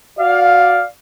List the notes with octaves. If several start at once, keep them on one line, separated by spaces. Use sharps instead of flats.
F#4 D5 F5